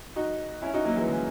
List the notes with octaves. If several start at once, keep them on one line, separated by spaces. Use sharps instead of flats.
D#4 F#4
C#4 E4
D#4 F#4
F#3 A#3
E3 G#3
C#3